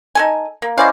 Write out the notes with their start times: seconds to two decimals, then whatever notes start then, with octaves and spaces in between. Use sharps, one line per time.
0.15 D#4 A4 G#5
0.62 A#3
0.78 G#3 C#4 E4 C5 D5 F5